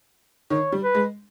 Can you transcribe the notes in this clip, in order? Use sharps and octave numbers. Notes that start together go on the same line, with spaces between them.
D#3 C#5
G3
B4
G#3